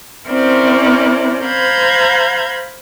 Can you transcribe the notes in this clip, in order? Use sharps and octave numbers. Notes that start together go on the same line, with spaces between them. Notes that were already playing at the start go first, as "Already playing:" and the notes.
C4 C#4 E4 A#4 C5 D5
C5 F5 A#5 B5 G6 G#6